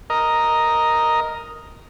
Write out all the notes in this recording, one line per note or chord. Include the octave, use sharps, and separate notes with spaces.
A#4 D#5